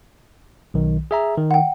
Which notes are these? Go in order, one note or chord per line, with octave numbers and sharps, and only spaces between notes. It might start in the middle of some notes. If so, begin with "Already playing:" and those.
B1 D#3
G#4 E5 A#5
D#3
F#5 G5